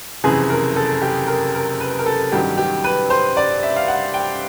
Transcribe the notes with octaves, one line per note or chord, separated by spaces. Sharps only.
F#1 F2 C3 E3 G#4
A#4
A4
G4
A#4
A#4
B4
A#4
A4
A1 G2 D#3 F#3 G4
G4
B4
C5
D5
E5
F5
F#5
G5